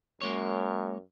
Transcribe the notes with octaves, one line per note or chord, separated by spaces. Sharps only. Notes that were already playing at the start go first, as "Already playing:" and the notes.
F#2 G#3 A#3 C#5